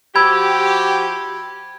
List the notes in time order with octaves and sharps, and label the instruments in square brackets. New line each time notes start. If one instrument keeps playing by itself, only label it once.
[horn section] F3 F#4 G4 [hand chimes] B5 E6 [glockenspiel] G#6